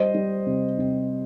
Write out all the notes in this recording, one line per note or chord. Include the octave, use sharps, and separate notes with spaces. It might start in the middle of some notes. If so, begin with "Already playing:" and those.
Already playing: G3 C5 D#5
G3
C3
C3